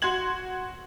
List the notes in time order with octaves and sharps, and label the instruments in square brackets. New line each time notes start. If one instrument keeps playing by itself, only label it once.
[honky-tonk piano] F#4 C6 G#6 F#7